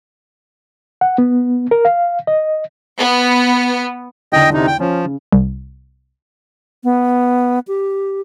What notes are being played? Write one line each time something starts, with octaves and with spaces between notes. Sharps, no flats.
F#5
B3
A#4
F5
D#5
B3
E2 D3 D#5 G5
C3 D#4
G5
F3 C#4
C#3
C2
B3
G4